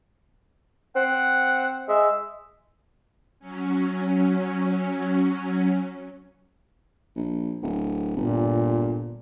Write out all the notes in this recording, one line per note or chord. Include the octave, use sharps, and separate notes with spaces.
C4 F#5
G#3 E5
F#3 C#4
A#1
D1
G1 A#2